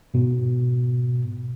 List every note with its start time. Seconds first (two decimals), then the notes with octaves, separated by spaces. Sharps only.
0.14 G#2 B2